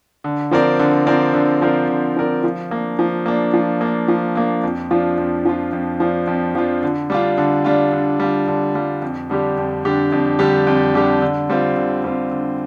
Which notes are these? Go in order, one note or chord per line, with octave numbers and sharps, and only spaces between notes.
D3
F3 C4 A#4 D5
D3
F3 C4 A#4 D5
D3
F3 C4 A#4 D5
D3
F3 C4 A#4 D5
F3
A#3 D4
F3
A#3 D4
F3
A#3 D4
F3
A#3 D4
F2
F3 D4 F4
F2
F3 D4 F4
F2
F3 D4 F4
F2
F3 D4 F4
D3
G3 D4 F4
D3
G3 D4 F4
D3
G3 D4 F4
D3
G3 D4 F4
F2
D3 G3 D4 G4
F2
D3 G3 D4 G4
F2
D3 G3 D4 G4
F2
D3 G3 D4 G4
D3
G3 C4 F4
D3
G3 C4 F4
D3